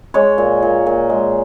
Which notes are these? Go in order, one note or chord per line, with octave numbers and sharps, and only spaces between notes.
G#3 C#5
A#2
A#2
A#2
G#3